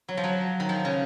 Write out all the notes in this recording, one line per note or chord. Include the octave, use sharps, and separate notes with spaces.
F#3
F3
F#3
D#3
F3
C#3